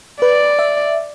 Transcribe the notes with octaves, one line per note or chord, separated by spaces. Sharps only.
B4 D5
E5